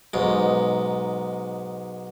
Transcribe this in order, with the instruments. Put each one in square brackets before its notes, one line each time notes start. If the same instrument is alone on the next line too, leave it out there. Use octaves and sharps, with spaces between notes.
[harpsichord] B1 G#2